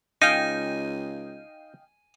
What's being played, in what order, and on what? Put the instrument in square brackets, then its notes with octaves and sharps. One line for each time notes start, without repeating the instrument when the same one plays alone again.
[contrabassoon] C#2 [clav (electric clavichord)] D#4 [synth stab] D#5 F5 G5 [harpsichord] G#5